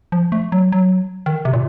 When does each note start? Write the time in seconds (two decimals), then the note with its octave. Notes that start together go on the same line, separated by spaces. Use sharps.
0.12 F3
0.32 A3
0.52 F#3
0.72 F#3
1.26 D#3
1.45 C3
1.53 A#2